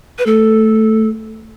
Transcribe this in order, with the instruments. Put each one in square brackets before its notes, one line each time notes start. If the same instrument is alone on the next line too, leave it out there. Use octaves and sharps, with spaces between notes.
[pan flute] B4
[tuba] A3 [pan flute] A4